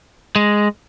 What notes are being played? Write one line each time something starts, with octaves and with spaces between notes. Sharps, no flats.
G#3